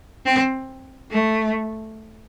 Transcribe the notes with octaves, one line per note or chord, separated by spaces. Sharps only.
C4
A3